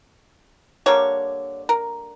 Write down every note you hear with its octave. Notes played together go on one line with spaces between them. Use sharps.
D3 G3 A#3 C#5
A#4